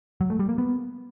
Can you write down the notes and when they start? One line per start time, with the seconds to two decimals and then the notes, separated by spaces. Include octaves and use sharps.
0.21 F#3
0.30 A3
0.39 G3
0.49 A#3
0.58 B3